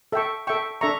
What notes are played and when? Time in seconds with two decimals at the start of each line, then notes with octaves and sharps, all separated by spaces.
0.12 A4 E5 G5 C#6
0.47 A4 E5 G5 C#6
0.81 D4 A4 E5 A#5 C#6